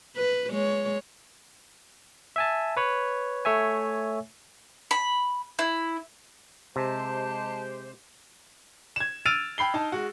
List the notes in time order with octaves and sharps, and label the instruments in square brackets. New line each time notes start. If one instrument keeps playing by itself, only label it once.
[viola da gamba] B4
G#3 C#5
[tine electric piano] E5 G#5 A5
B4 C#5 B5
A3 C#5 E5 G#5
[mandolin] B5
E4
[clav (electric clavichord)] C3 [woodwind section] G#3 G4 C5 [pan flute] A5
[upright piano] G#6 E7
E6 F6 A6 D7 D#7 F7
G5 B5 C7 G7
D#4 A5
G#3 F#4